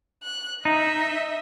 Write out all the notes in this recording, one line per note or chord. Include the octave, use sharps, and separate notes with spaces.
F#6
D#4 D#5 E5